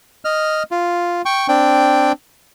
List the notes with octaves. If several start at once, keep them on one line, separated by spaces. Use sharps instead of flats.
D#5 F6
F4
G5 C#6
C4 D4 G5